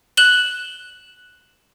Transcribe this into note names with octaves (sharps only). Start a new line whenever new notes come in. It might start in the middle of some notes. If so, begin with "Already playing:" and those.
F#6 E7 F#7 G7